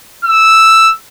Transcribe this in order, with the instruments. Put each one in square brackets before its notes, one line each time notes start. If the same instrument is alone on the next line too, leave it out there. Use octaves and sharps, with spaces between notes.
[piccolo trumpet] E6